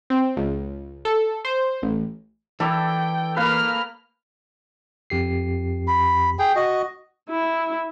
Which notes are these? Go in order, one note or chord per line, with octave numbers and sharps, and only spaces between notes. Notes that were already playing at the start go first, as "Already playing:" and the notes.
C4
C#2
A4
C5
A1
E3 A4 D5 G5
A#3 B4 F5 F6
F2 G4 C7
B5
G#4 G5
F#4 D#5
E4